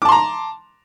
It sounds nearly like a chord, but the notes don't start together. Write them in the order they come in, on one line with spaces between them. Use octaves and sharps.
D6 A5 C6 A#5